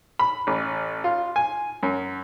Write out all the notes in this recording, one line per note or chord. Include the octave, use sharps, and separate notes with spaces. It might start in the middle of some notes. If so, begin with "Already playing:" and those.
B5
A1
F4
G#5
F#2